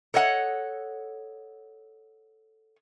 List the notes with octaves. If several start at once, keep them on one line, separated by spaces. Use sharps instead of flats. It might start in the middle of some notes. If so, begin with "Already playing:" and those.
A4 C#5 D#5 F#5